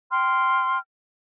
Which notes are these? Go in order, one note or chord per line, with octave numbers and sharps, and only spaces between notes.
G5 C6 F6